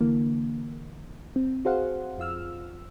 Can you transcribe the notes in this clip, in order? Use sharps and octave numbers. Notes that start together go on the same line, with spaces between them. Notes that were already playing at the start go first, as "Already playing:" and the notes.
D3 E3 A#3
C4
F#4 G#4 C5 F5 F#5
F2 F4 E6 F6